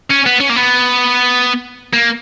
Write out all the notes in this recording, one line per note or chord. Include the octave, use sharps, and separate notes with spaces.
C#4
B3
C#4
A#3
B3
A#3